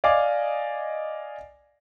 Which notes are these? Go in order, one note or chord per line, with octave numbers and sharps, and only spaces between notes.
D5 D#5 F5 G#5 D6